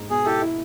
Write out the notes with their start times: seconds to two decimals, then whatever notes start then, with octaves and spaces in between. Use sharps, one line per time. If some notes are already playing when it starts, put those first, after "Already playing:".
Already playing: G#2
0.10 B2 G#4
0.25 E4 G4 A4
0.42 E4